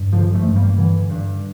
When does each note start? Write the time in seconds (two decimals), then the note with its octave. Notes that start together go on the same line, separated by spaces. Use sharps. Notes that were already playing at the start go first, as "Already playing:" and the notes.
Already playing: G2
0.13 A1 D3 F3
0.34 F3 A3
0.46 G2
0.56 G3 A#3
0.78 D3 E3
1.10 G2